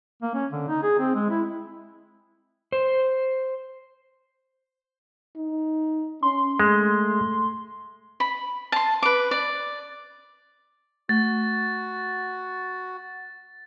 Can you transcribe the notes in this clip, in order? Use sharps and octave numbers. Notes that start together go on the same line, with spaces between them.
A#3
C#4
D3
D#4
G#4
C4
G#3
E4
C5
D#4
C#4 C6
G#3 A3
B5
A5 C6
B4 D6
D5
A3 F#4 A6